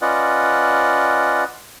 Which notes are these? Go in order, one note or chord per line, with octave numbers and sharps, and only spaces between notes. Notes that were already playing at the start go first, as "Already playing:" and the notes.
C#4 F4 B4 D5 D#5 F#5